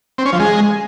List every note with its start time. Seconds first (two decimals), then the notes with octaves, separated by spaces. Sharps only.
0.18 C4
0.25 C#4
0.33 F3
0.40 G#3